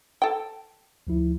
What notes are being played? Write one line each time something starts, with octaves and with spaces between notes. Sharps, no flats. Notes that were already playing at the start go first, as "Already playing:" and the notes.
A4 G5
D2 F3 E4